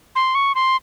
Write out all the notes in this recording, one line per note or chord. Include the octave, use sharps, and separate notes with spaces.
C6
C#6
C6